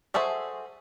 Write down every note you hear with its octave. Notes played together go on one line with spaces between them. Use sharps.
F#4 G#4 A4 C5 E5